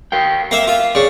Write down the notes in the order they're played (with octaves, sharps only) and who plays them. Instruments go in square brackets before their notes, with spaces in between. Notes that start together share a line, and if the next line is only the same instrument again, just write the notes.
[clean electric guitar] A#4 F5 G5
[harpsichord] A#3 E5 [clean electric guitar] F5
[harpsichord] F4
[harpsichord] C#3 [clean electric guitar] D5